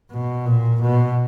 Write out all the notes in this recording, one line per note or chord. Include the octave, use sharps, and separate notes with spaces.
B2
A#2
B2